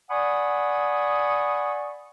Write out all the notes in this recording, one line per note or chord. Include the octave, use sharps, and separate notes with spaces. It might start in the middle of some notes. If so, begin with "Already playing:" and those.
D5 F#5 G#5 B5 C#6 D#6